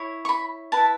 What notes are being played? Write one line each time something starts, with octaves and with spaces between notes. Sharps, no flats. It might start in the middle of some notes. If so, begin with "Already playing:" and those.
Already playing: E4 C#5
C#6
B5
E4 B4 A5